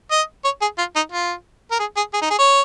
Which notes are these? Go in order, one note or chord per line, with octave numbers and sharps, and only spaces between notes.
D#5
C#5
G#4
F4
D#4
F4
A#4
G#4
G#4
G#4
D#4
G#4
C#5